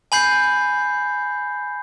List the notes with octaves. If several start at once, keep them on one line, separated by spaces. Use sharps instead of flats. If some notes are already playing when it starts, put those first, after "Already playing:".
G#5 B5 G6 C7